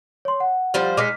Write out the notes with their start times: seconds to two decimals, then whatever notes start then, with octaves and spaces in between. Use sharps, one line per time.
0.25 C#5 C6
0.40 F#5
0.74 F3 G3 C5
0.97 G#3 D#4 D6 F6 B6